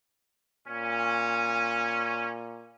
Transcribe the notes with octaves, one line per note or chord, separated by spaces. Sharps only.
A#2 C#4